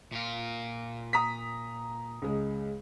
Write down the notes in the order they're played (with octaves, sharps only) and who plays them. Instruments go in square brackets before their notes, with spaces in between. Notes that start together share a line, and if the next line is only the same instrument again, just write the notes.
[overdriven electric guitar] A#2 F4
[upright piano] A#5 D#6 B6
[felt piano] C#2 G#3